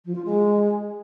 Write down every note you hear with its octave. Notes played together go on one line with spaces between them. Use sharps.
F3
F4
G#3